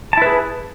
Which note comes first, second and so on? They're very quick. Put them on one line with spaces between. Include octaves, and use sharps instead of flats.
A5 E4 B4 G#4